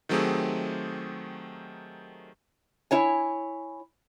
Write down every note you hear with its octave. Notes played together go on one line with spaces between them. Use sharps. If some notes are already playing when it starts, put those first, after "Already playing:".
D#3 F#3 A3 C4 G4 G#4
E4 C#5 G#5